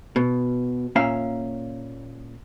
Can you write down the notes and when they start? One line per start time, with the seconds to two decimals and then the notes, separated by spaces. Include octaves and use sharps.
0.16 B2
0.96 A#2 C#4 E5 F5 A#5